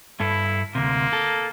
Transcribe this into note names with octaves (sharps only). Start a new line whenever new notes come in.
G2 E4 A4
D2 C3 A#3
A4